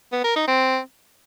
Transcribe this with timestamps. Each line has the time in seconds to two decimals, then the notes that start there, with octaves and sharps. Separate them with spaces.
0.12 B3
0.24 A#4
0.36 D#4
0.47 C4